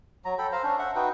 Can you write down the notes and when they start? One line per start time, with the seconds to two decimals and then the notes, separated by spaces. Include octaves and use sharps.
0.25 F#3 A#5
0.39 A4 G5 B5
0.52 C5 F5 A#5
0.64 C#4 D4
0.79 E5 F#5
0.96 D#4 F#4 B4 G5